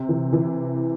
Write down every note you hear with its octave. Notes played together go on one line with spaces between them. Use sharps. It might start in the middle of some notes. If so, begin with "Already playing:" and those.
Already playing: C3
E3
E3